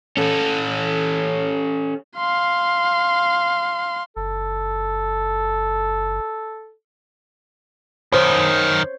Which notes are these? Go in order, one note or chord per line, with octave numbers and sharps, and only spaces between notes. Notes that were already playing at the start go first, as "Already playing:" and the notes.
C#4 A4
F5 C6
F#1 A4
F#2 D#3 C5 C#5